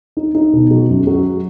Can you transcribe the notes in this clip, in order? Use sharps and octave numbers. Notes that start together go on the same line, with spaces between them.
D#4
D#4
B2
F#3
F#2
F#3